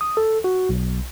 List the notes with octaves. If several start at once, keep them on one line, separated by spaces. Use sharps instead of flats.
D#6
A4
F#4
B1